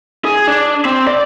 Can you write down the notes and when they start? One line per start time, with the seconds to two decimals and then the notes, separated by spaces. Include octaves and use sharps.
0.25 G#4
0.47 D4
0.85 C4
1.07 D5